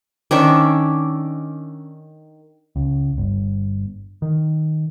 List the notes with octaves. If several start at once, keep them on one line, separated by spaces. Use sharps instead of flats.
D#3 C#4 D4 E5
C#2
G1
D#3